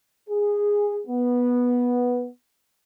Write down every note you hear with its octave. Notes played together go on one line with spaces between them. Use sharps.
G#4
B3